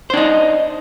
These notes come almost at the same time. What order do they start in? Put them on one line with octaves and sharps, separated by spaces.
C5 D4 D#4